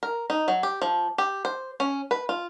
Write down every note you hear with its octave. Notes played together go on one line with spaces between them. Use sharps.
A#4
D#4
F#3
G4
F3
G4
C5
C#4
B4
F4